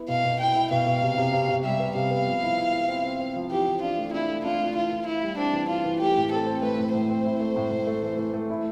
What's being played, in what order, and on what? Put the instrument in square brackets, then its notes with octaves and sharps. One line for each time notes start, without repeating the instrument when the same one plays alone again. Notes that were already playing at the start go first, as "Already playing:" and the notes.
Already playing: [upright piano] B3 E4
[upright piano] B2 [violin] F5
[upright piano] B2
[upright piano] E4 [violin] G5
[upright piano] E4
[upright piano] B2 [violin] F5
[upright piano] B2
C3
C3
C3
C3
[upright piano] G3 [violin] E5
[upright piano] B3
[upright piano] C3 [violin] F5
[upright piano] B3
F3
E4
E4
E4
C4
C4
C4
F3
[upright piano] E3 [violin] G4
[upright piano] E3
[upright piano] D4 [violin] F4
[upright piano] A3
[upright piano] D4 [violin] E4
[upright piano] A3
[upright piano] D4 [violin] F4
[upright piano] A3
[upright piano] E3 [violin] F4
[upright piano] E3
[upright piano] E3 [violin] E4
[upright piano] G3
[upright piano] C4 [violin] D4
[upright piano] E3
[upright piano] E3 [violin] F4
[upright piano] E3
[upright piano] A3 [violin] G4
[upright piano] A2
[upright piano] C4 [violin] A4
[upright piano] C4
[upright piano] A3 [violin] B4
[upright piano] A2
[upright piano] A2 [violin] C5
[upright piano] C4
E4
A3
A2
A2
A3
E3
E3
A3
E4